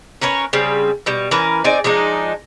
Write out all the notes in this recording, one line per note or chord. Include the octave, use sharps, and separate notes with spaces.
C#4 A#4 B4 C#5
C#3 G3 C4
B2 G3
E3 C#4 A#4 B4
C4 D#4 G#4 D5
F3 G#3 D4 D#4